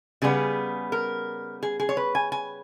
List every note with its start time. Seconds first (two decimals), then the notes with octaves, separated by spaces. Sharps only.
0.22 C#3 G3 B3 G#4
0.92 A#4
1.63 G#4
1.80 G#4
1.89 C#5
1.97 B4
2.15 G#5
2.32 G#5